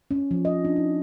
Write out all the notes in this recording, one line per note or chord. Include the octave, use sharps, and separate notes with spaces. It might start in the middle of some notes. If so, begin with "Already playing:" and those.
C#4
F3
D#5
D4
D#4